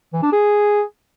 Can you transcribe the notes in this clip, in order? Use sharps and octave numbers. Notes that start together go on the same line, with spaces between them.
E3
D4
G#4